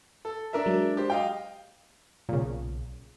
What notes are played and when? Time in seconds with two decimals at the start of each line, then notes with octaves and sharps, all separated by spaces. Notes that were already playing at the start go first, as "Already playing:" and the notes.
0.25 A4
0.53 D4 A#4 E5
0.66 F#3 G#3
0.97 G4 C5
1.10 D#5 F5 G5
2.29 B1 A#2 C#3